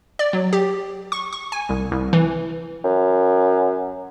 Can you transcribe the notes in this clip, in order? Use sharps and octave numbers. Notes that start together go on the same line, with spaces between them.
D5
F#3
G4
C#6
C#6
G#5
C2
C2
E3
F#2